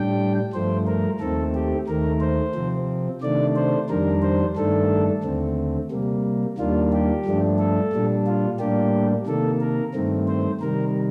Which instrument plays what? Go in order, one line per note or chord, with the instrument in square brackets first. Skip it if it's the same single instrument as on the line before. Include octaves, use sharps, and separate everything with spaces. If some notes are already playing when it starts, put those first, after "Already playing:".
Already playing: [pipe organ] A2 G3 D4 G5
G2 F3 A3 C5
A#4
D#2 D#3 A3 C4 A4
G4
D#2 D#3 A3 A#4
C5
C3 F3 C4
C3 D#3 A3 D4 D5
C5
F2 D#3 G3 D4 A#4
C5
G2 D#3 A3 D4 A4
D#2 D3 A3 C4
C3 G3 A#3
D#2 D#3 G3 A#3 D4 F4
G4
G2 F3 A3 D4
A4
A#2 G3 D4
F4
A2 G3 A#3 D4 G4
C3 D#3 A#3 A4
A#4
G2 D#3 A3 C4
C5
C3 D#3 G3 A#4